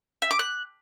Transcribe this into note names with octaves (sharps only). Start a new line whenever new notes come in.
E5
D6
F#6